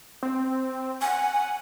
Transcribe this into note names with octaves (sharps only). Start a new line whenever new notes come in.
C4
F#5 G#5